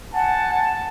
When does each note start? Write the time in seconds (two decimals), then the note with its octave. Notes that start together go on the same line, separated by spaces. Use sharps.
0.14 F#5 G#5 A5